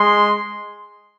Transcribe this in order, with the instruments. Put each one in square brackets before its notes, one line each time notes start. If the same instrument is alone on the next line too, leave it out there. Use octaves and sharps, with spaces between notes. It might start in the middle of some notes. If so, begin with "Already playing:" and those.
Already playing: [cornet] G#3 [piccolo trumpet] C6